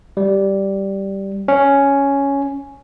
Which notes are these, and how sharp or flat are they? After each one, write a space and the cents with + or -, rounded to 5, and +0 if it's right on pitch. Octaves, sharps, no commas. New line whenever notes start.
G3 -5
C#4 +5